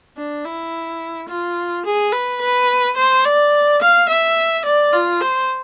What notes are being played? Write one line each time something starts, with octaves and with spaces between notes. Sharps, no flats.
D4
E4
F4
G#4
B4
B4
C5
D5
F5
E5
D5
F4
C5